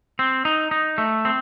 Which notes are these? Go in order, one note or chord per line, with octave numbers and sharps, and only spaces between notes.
C4
D#4
D#4
A3
C4